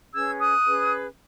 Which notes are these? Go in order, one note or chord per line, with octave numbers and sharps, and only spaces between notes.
C#4 G#4 B4 E6 G#6
D#6 F#6
C#4 G#4 B4